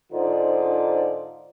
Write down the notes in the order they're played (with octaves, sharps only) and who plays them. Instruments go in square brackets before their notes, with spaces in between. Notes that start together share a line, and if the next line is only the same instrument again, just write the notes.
[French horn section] G#2 D3 D#4 F4 C5 D5